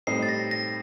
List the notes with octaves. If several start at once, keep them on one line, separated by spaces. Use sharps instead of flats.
A2 G3 C4 D#4 C7
A6
A#6
A#6